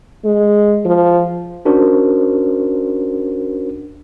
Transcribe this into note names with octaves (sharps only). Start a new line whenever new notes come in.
G#3
F3
C#4 D4 F#4 A#4 C5